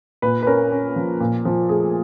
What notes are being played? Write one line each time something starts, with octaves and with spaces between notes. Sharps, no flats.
A#2 B4
B4
C#4 A#4
C#4
F3
A#2
F3
A3 G#4